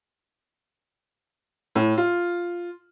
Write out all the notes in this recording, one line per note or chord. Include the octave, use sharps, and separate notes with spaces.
A2
F4